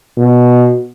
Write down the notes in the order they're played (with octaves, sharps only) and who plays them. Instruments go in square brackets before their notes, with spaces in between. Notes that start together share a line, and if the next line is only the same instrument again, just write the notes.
[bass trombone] B2